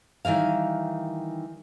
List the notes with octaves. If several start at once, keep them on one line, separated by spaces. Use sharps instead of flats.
D#3 E3 G3 F5